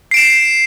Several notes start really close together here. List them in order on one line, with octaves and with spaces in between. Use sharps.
C7 D7 E7